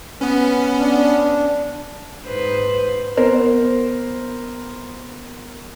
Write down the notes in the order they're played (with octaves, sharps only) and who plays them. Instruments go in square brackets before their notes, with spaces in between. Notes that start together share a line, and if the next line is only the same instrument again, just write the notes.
[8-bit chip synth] B3 C#4 [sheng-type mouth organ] B4
[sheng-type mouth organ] D4
[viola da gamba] G#2 B4 C5
[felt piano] B3 A#4 C5